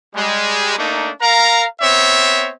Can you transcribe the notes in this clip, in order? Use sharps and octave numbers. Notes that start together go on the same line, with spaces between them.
G3 G#3
A3 A#3 D4 D#4
A#4 F5 A#5
B3 C4 C#5 E5